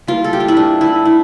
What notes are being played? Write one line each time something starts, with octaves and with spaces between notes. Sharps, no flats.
E3 G3 A#3 F4
A4
G4
F4
E4
D4
E4
E4